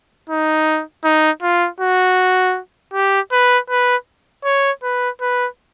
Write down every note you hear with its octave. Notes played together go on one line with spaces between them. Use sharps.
D#4
D#4
F4
F#4
G4
B4
B4
C#5
B4
B4